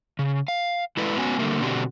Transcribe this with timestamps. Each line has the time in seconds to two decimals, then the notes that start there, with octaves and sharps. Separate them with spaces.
0.19 C#3
0.48 F5
0.97 G#3 E4 A4 B4 D5 F5
1.17 B3 C#4 F#4 G#5
1.39 D3 G3 A3 A#3
1.61 B2 D3 C4 D4 F#4 G4